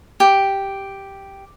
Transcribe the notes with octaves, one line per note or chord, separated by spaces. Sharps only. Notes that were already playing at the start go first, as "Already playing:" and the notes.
G4